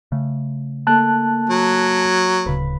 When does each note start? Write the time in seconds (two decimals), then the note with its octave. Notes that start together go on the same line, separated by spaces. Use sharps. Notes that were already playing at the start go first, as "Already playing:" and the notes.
0.12 C#3 A3
0.87 A#3 A4 A5 C6 F#6
1.50 F#3
2.46 D1 C#3 B4